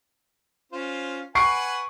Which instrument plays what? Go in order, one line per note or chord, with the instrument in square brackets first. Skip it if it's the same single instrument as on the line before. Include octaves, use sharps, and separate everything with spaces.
[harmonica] C#4 F4 C5
[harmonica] B4 F#5 G#5 [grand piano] C#6 C7 D7